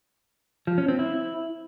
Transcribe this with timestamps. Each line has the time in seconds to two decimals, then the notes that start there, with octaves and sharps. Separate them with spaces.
0.67 F3
0.78 C#4
0.88 C4
0.99 E4